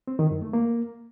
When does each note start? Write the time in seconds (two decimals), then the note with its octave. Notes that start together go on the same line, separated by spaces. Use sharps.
0.08 C4
0.19 D#3
0.30 F#2
0.42 A3
0.53 A#3